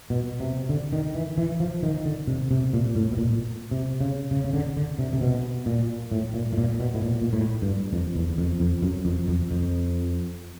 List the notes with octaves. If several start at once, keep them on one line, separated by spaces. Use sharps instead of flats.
B2
C3
D3
D#3
E3
E3
F3
D#3
D3
C3
C3
A#2
A2
B2
A#2
C3
C#3
C#3
C#3
D3
D3
C3
C3
B2
A#2
A2
A#2
A2
A#2
B2
A2
A#2
A#2
A2
G2
F2
E2
F2
F2
F#2
F2
F2
F2